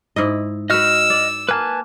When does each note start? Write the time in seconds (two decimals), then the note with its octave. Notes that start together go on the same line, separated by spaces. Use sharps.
0.16 G#2 E4 D#5
0.70 F#4 B4 D#5 E6 F6
1.10 D5
1.49 A#3 B4 G#5 A5